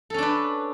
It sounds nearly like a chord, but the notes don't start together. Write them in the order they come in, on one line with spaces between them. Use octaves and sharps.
A4 C#4 D4 B4